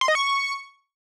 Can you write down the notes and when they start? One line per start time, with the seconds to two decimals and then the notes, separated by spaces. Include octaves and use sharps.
0.01 C6
0.08 D#5
0.15 C#6